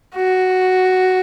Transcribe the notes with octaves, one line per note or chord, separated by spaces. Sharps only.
F#4